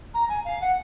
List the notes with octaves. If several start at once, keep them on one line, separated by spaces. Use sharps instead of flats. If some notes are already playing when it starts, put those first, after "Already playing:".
A#5
G#5
F5
F#5